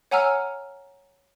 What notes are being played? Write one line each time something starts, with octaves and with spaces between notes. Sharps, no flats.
C#5 F#5 G#5 A#5 E6 F6